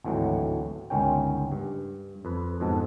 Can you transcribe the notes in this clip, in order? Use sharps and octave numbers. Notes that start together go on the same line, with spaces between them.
G#1 D2 A2 E3 F#3
G1 C#2 D#3 C#4 G5
G2
F2 B4
F2 G#2 B2 A4